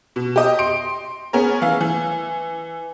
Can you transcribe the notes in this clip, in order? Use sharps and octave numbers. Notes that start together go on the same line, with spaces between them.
B2
G4 D#5
C6 D7
B3 C#4 G#4 A#4
E3 F5
E3